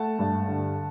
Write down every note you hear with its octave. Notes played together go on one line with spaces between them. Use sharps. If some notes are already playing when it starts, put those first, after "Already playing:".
Already playing: A3 F#5 A5
G2
D3